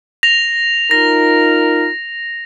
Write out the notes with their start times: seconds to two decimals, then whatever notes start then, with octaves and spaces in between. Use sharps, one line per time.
0.23 A#6 F7
0.91 D#4 F4 A#4 A#6